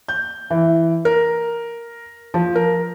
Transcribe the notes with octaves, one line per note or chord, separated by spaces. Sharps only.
G6
E3
A#4
F3
A#4